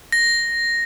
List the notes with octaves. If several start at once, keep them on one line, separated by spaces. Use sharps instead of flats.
A#6